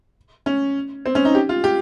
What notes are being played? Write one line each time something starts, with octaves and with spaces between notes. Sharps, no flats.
C#4
C4
C#4
D#4
G4
F4
G4